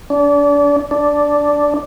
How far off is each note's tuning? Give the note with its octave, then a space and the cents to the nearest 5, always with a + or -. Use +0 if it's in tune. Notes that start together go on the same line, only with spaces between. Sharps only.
D4 -30
D4 -5